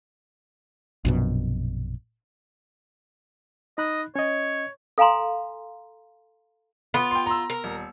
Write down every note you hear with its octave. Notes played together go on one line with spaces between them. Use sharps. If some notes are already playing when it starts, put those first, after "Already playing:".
A#1 F#2 B2
D#4 D#5 B5 F#6
C#4 C#5 D#5
A4 F5 G#5 A#5 C6
B3 F4
G5 C6
A#5 C6 E6
A#4
D#1